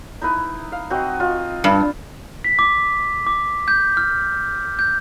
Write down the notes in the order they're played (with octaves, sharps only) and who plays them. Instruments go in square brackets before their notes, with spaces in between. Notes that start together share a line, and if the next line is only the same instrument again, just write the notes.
[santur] D#4 E4 B4
F5
C4 F#4 D#5
F4 D#5
[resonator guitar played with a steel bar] G2
[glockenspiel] B6
D6
D6
G6
F6
G6